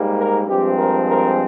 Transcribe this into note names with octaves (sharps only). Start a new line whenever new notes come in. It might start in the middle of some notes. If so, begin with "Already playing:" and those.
Already playing: G#2 G3 A#3
A#4
G2 F3 G#3 C4 G4
A#4
A#4